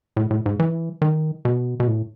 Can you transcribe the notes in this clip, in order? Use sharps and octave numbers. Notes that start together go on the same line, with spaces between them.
A2
A2
G#2
E3
D#3
B2
B2
A2